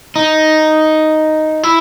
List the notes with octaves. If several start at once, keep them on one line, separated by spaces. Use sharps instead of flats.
D#4
E4